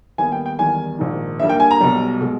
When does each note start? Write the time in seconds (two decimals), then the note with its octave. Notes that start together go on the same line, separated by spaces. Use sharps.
0.18 D#2 D#3 G3 B3 G#5
0.32 G5
0.46 G5
0.59 E2 D#3 G3 G#5
0.99 A#1 G#2 D#3
1.39 G2 E5
1.43 G3 A#3
1.50 G5
1.60 G#5
1.71 A#5
1.80 B1 B2 G3
2.21 B2 G#3